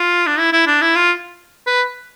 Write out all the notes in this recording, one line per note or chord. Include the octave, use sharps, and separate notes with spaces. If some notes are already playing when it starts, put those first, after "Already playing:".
Already playing: F4
D4
E4
E4
D4
E4
F4
B4